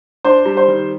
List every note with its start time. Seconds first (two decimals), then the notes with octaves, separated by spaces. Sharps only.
0.25 D4 C5
0.46 G3
0.57 C5
0.68 D#3